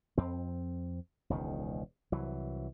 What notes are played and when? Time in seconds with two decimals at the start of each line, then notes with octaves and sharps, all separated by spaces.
0.18 F2 C4
1.30 E1 C#2 D#3
2.12 C2 E3 F#3